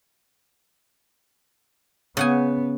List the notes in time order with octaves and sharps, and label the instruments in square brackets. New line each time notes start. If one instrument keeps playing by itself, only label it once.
[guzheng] C#3 F#5 G#5 [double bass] B3